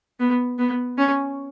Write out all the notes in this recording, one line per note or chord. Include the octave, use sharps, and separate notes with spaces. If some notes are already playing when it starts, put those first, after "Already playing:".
B3
B3
C#4